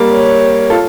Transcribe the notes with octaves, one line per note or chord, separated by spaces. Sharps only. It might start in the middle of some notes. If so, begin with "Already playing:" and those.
Already playing: G3 A#3
C#5
F4 A4